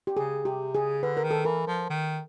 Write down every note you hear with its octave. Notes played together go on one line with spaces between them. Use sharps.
G4
C#3 G#4
C3 G4
C#3 G#4
D3 B4
A#4
D#3
A4
E3 A#4
F3
D#3